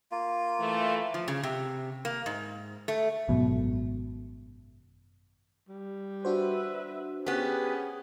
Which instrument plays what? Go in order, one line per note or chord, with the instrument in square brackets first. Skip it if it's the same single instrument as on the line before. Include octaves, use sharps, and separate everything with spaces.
[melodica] A#3 F4
[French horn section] E3 A3
[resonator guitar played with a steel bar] F3
C#3
C3
A#3
G#2
A3
[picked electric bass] G#1 F#2 B2
[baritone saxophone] G3
[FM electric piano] D4 F#4 C5 [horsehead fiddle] B4 E5
[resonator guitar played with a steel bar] B3 G4 [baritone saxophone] C#4 [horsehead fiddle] G#4